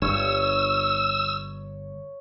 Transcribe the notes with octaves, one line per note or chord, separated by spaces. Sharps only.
G1 G2 C#5 E6